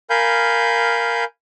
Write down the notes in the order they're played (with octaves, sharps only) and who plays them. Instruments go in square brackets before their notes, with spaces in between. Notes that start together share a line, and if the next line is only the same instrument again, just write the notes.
[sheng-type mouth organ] A#4 F5 G#5 B5 G6